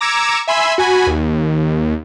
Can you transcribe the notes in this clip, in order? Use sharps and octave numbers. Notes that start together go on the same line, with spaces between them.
A#5 D6 E6 G#6 C#7 E7
E5 G#5 B5 C6 E6
F#4 G#5 B5
D#2